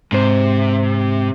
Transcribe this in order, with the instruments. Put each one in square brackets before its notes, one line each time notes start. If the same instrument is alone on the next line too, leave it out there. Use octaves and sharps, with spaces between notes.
[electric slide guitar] G#2 C5 [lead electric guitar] C3